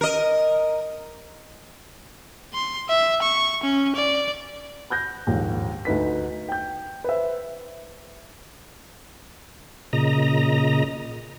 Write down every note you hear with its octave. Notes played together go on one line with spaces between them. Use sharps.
A#4 D#5
C6
E5
C#6
C#4
D5
B5 F#6 G6 A#6
A#1 D#2 G#2
D2 D#4 B4 B6
G5 G6
B4 C5 E5
A#2 C#3 D#5 A#5